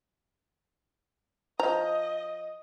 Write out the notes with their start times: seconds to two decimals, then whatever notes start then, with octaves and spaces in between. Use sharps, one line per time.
1.60 F3 D#5 A#5